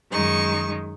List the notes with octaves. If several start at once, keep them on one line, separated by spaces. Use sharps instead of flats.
F#2 D#3 G#3 D#4 C#6